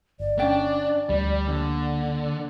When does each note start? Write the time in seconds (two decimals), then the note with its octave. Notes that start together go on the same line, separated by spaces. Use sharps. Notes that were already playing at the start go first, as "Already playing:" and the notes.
0.20 G1 D5
0.39 C#4 D4 G5
1.09 D2 F3 G3 A3
1.48 D3 A#3